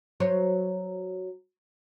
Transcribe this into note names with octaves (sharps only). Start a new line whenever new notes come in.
F#3 C5 C#5